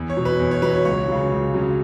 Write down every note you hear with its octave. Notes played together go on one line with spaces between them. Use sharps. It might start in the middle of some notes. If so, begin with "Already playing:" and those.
Already playing: E2
C#5
B2 F#3
B4
E2
C#5
B2 F#3 B4
C#5
C#2 C#5
C#3 F#3
C#2
C#3 F#3